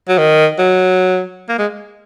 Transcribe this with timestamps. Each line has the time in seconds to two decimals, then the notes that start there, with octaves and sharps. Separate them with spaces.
0.08 F#3
0.18 D#3
0.59 F#3
1.49 A#3
1.59 G#3